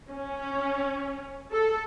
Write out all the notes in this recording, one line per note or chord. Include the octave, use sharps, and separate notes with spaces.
C#4
A4